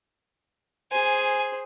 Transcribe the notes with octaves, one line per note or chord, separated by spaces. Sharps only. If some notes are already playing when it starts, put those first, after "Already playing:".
G#4 C5 G#5